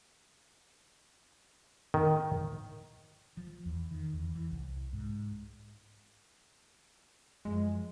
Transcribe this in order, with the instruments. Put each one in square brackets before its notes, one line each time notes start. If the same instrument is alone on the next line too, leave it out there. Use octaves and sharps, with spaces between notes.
[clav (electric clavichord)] D#3
[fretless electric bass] F3
E2
D#3
E2
E3
C2
G#2
[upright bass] F#2 F3 [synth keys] G#3